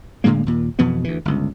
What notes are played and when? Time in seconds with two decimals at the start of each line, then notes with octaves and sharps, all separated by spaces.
0.24 A2 D3 G#3 A#3
0.46 D#2 A#2
0.79 F2 B2 E3 B3
1.04 D2 E3
1.25 G1 C#2